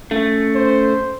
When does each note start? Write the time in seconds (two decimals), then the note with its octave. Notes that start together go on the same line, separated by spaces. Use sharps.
0.11 A3 C#4
0.55 C5